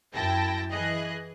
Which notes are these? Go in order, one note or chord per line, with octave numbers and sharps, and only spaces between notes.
F#2 E4 G5 A5 A#6
E3 G#4 D#5 F#6